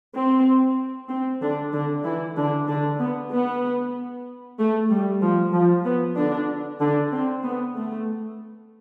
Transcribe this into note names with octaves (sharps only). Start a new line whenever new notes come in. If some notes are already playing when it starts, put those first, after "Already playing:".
C4
C4
D3 D4
D3 D4
E3 E4
D3 D4
D3 D4
B3
B3
A3
G3
F3
F3
B3
D3 D4
D3 D4
C4
B3
A3